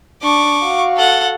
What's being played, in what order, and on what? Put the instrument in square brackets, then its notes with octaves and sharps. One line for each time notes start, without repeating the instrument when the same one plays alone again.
[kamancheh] D4 [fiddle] C#6 D6
[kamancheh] F#4 F5
[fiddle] A4 F#5